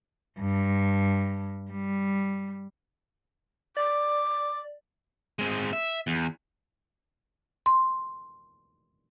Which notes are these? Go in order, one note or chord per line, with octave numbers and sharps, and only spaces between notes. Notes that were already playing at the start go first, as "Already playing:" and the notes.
G2
G3
D5 D6
G#3 C4
E5
E2
C6